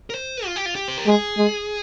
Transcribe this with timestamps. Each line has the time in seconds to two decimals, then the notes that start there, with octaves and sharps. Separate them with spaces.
0.10 A#4
0.15 C5
0.45 F4
0.56 G4
0.66 F4
0.75 G4
0.88 C5
0.97 A#4
1.06 G#3 G#4
1.37 G#3